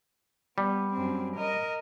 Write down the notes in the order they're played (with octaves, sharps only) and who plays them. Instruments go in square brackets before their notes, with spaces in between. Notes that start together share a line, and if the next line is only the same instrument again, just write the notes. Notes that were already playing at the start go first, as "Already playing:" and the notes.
[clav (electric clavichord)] G3 [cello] B3
[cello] F#2 C4
A#4 D#5